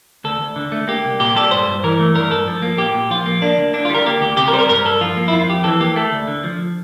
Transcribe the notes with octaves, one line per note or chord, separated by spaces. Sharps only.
D2 A4
D2
D3
A3
A#3 G4
C2
A#2 G4
G3 A4
G2 C5
G2
E3 A#4
A3
G2 A#4
G2 A4
F3
A#3
A#2 G4
A#2
F3 F4
A#3
A#3 D4
D2
D3 D4
F4
G3 A#4
A#3 G4
D2 G4
C3 G4
A#4
G3 C5
A#4
G2 A#4
G2 A4
F3 F4
A#3
E4
F2 F4
F2 G4
E3 A4
A#3 G4
A3 A4
D2
D3
F3